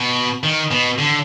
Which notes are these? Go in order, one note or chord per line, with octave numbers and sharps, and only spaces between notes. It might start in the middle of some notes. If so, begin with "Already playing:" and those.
Already playing: B2
D#3
B2
D3